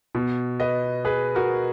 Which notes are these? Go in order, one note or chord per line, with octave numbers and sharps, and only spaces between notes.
B2
B4 D#5
G#4 B4
F#4 A#4